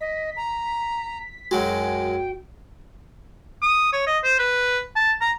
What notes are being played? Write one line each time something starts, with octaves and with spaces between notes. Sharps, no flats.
D#5 B6
A#5
F#2 F#3 G#3 F#4 G5
D#6
C#5
D#5
C5
B4
A5
A#5